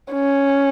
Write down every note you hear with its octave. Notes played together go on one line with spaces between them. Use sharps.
C#4